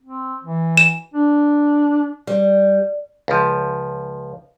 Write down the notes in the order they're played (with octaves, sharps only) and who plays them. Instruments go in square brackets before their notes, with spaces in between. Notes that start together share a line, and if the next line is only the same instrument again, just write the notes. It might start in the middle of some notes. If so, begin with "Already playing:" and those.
[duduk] C4
E3
[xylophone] E7
[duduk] D4
[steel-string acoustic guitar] G3
[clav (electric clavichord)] C#2 F3